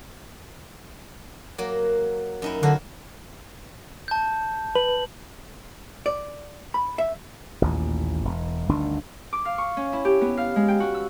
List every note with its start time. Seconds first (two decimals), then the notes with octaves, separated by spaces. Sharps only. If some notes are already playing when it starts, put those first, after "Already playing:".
1.58 F#3 A#3
2.42 F#2 D#4 E4
2.63 D3 F#3 F#4 F5
4.08 A5 G6
4.75 B4 F#7
6.06 D5
6.74 B5
6.98 E5
7.62 A1 D#2 A#2
8.25 E1
8.69 G1 D2 D#3 D4
9.33 D6
9.45 F5
9.58 C#6
9.77 C#4
9.93 E4
10.05 G4
10.21 B3
10.37 F5
10.56 G#3
10.68 G5
10.80 F#4
10.95 E6